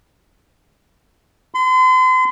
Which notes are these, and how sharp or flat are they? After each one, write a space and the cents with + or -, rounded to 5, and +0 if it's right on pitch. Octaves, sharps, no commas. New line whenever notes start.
C6 -40